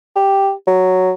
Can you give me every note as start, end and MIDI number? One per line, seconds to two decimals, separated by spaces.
0.16 0.52 67
0.67 1.13 54